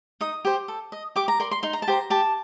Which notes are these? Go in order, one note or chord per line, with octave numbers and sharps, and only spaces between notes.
D#4 D#6
G4 C5
A4
D#5
G4 D6
A#5
A#4 D5 C6
C6
D#4 C6
A#5
A5
G4 C5 A#5
G4 A5